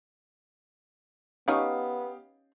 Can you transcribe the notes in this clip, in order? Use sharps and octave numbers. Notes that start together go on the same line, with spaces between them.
B3 C#4 D#4 G4 C#5 F5 D#6